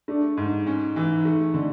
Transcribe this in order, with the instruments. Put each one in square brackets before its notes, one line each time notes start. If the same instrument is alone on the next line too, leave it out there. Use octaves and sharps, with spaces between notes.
[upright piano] A3 [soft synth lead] D4
[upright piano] G#2 [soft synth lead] D#4
[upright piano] C#4
E3
A3
D3